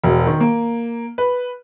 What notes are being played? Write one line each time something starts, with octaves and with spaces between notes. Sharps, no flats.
E1
D#3
A#3
B4